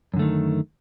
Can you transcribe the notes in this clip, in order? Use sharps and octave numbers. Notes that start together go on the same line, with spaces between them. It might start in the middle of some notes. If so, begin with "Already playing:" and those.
F#2 D3 D#3 A3